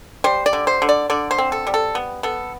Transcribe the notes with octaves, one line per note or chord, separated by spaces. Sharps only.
G3 C5
D5
D3
C5
D3
D5
D3 D5
C5
C4
A4
G3
A4
B3
B3 A4